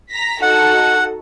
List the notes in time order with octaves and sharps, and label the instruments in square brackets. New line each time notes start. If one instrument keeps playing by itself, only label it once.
[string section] A#5 A#6 B6
[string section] D#4 F#4 A4 [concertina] F#5